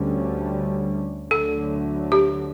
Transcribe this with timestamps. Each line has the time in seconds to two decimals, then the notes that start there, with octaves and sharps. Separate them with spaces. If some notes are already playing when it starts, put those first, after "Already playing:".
Already playing: D2 D3 G3 C#4
1.31 D2 D3 F#3 A3 A4
2.12 G4